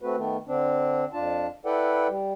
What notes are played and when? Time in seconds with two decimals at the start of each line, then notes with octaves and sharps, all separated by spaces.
0.02 A3 C4 F#4 B4
0.17 D#3 A3 B3
0.47 D3 C4 D4
1.13 F2 D4 F4 A5
1.65 E4 A4 B4 D5 F#5 G5
2.09 G3